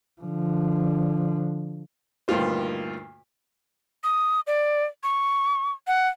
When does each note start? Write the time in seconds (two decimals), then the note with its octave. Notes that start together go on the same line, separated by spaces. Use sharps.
0.21 D3 F3
2.28 D2 G2 A#2 D#3 F4 C5
4.04 D#6
4.47 D5
5.03 C#6
5.87 F#5